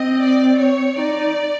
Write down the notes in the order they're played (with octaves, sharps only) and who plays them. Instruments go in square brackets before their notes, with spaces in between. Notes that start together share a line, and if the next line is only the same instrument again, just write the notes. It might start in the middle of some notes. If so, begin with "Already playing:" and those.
Already playing: [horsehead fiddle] C4 [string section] D#5
[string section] D5
C#5
[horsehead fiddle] D#4 [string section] D5